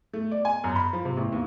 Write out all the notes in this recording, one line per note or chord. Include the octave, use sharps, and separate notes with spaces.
A3
D5
G#5
F#2
B5
F3
C3
A1
D#2